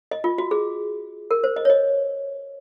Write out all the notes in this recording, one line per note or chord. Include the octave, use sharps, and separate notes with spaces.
D#5
F4
F#4
G#4
A#4
C5
D#5
C#5
D#5